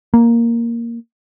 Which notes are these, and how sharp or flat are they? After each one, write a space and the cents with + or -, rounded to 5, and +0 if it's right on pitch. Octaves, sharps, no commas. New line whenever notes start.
A#3 +0